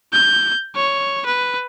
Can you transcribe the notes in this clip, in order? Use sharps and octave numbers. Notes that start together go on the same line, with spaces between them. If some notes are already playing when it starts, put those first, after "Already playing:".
G6
C#5
B4